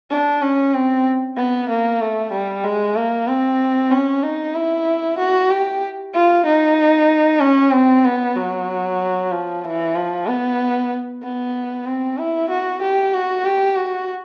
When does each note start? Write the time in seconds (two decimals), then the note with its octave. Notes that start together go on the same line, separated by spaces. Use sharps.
0.10 D4
0.42 C#4
0.74 C4
1.37 B3
1.69 A#3
2.01 A3
2.32 G3
2.64 G#3
2.96 A#3
3.28 C4
3.91 C#4
4.23 D#4
4.55 E4
5.18 F#4
5.50 G4
6.14 F4
6.46 D#4
7.41 C#4
7.73 C4
8.05 B3
8.36 F#3
9.32 F3
9.64 E3
9.95 F3
10.27 B3
11.23 B3
11.86 C4
12.18 E4
12.50 F#4
12.82 G4
13.14 F#4
13.45 G4
13.76 F#4